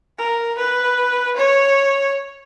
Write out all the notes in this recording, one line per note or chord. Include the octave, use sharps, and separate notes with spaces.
A#4
B4
C#5